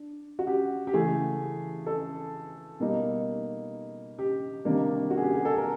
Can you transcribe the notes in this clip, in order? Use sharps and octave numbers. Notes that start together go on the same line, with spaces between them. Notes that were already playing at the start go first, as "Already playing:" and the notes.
Already playing: D4
F#4
G4
G4
C#3 E3 A3 G#4
A4
B2 G3 A#3 D#4
G4
C3 D#3 G3 A#3 D4
F#4
G#4
G4
G#4
A4
A#4